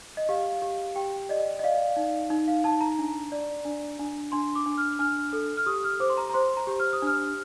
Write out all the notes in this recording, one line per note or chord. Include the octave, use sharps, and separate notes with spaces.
D#5
G4 F5
G4
G4 G5
D5 D#5
D#5
D5 F5
D#4
D#4
F5
D#4 A5
A#5
D4
D5
D4
D4
D4 C6
D6
D4
F6
D4 F6
A4
F6
G4 D#6
F6
C5 D6
C6
A#5
A#5
C5 C6
A#5
G4
F6
D#6
D4 F6